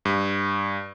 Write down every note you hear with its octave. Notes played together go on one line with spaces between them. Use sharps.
G2